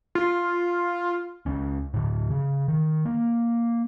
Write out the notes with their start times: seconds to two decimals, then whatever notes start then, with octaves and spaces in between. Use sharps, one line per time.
0.15 F4
1.46 C#2 C#4
1.94 A2 D3
2.30 C#3
2.68 D#3
3.05 A#3